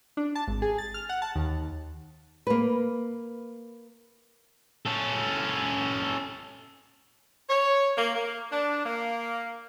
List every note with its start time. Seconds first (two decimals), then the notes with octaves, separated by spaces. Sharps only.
0.17 D4
0.35 A5
0.47 G#1
0.62 G#4
0.78 A6
0.94 F6
1.09 F#5
1.22 A5
1.35 D#2
2.47 A#3 B4
4.86 C#4 A4
7.49 C#5
7.97 A#3
8.15 A#3
8.51 D4
8.85 A#3